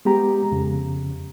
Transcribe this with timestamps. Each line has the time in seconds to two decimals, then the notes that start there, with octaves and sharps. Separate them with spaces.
0.05 G#3 B3 G4 A#5
0.52 F2 C#3